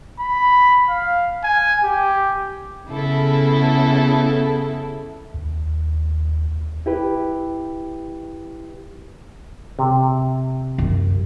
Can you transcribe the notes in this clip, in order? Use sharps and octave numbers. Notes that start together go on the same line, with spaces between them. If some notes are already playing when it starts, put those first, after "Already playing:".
B5
F5
G#5
G4
C#3 B3 E4 A4
D#2
E4 G4 B4
C3
F#2